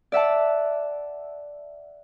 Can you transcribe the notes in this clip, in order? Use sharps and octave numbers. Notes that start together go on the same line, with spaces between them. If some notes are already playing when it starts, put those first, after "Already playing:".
D5 E5 F#5 A5